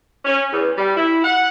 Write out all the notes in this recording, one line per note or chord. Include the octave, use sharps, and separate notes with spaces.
C#4
E2
G3
E4
F#5